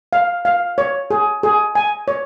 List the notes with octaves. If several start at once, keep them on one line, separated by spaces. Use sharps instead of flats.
F5
F5
C#5
G#4
G#4
G#5
C#5